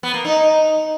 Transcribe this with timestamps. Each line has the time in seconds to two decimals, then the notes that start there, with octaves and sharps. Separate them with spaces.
0.03 B3
0.14 A#3
0.25 D#4